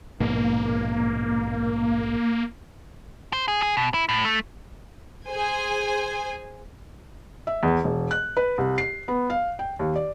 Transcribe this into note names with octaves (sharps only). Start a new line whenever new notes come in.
A#1 G#2 B2 A#3
C5
G#4
G#4
B2
E4
A2
A3
G#4 C5 G#5
E5
E2
E1
F#6
B4
C2
C7
B3
F5
G5
D#2
D5